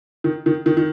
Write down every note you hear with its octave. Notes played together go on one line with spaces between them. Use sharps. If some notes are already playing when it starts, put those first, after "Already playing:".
D#3
D#3
D#3
D#3